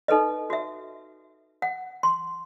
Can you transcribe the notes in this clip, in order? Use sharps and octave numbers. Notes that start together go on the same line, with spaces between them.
D#4 A4 B4 D#5
F#4 E5
F#5
C6